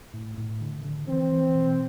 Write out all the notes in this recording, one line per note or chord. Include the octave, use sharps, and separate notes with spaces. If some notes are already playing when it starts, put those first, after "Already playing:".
A2
A2
D3
D3
E3 C4
E3
B2